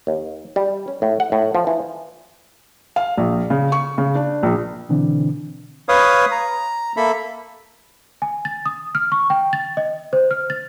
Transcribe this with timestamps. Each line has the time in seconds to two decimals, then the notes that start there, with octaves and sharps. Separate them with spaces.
0.07 D#2
0.56 G3
0.88 C#4
1.02 A2
1.20 F#5
1.32 A2
1.55 F3
1.67 E3
2.96 F5
3.17 A#1
3.50 C#3
3.72 C#6
3.98 C#3
4.15 D4
4.43 A#1
4.89 B2 D3 E3 C4 D4
5.89 B4 C#5 F5 D#6
6.31 A#5
6.97 A#3 A4 E5 B5
8.22 G#5
8.45 A6
8.66 D#6
8.95 F6
9.12 C#6
9.30 G5
9.53 A6
9.77 D#5
10.13 C5
10.31 F6
10.50 A6